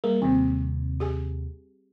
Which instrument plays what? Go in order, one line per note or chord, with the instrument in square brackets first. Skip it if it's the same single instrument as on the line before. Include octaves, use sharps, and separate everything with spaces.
[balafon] G3 G#4 [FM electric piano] A#3
[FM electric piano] D#2 C3 [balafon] C4
[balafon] G4 G#4 G#5